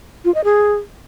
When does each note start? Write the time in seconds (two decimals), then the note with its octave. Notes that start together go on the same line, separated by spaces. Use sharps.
0.25 F4
0.34 D#5
0.44 G#4